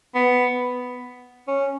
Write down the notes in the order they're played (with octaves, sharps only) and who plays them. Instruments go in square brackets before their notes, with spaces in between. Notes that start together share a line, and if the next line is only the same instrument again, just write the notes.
[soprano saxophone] B3
C#4